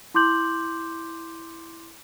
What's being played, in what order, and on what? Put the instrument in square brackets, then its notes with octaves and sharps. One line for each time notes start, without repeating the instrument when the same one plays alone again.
[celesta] E4 C6 D6 G6 F#7